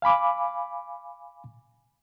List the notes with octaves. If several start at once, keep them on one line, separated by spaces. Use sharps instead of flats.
F5 G#5 B5 D6